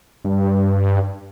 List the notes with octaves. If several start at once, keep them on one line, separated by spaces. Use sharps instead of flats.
G2